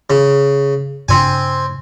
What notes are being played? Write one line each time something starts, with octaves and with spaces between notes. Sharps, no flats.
C#3
G2 C#3 C4 D4 G#5